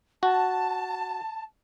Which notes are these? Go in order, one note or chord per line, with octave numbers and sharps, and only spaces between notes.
F#4 A5